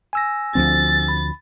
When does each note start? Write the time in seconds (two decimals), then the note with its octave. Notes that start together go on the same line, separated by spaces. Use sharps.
0.13 G#5 E6 A#6
0.55 D2 F3 C4 A6
1.08 B5